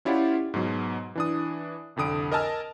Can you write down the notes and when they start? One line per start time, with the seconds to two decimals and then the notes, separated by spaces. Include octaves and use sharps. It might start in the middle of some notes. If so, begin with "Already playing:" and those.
0.05 C#4 E4 F4 G4 D5 F#5
0.54 G#2 B2 F#3
1.15 E3 D4 D#6
1.96 C2 F2 D3 D#6 D7
2.32 A#4 D#5 G#5 A5 E6 F6